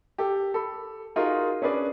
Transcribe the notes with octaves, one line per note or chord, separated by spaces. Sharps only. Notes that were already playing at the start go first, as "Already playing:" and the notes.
G4 A4
A4 B5
D#4 F4 F#4 G#4 A#4
C#4 D4 G#4 B4 D5